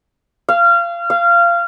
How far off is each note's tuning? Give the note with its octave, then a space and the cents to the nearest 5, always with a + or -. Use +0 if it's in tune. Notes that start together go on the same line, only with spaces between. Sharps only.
F5 -25
F5 -20